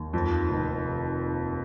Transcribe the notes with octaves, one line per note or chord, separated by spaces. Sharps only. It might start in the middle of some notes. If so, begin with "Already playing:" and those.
Already playing: D#2
F2
F1